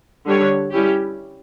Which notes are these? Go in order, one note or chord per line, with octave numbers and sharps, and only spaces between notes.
D3 G3 D4 G4 C#5
G3 C#4 E4 G4